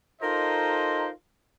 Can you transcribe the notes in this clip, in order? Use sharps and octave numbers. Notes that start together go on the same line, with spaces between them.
D#4 F4 A4 A#4 C5 D#5